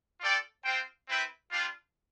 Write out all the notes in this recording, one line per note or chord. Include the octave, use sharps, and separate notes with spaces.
F4 A4 D5 G5
C4 F4 C5 G5
C4 E4 B4 E5 G5
G3 D4 F4